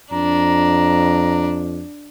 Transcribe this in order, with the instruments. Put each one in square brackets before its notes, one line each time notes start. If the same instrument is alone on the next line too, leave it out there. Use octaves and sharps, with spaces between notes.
[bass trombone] F2 [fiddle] D4 [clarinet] A#5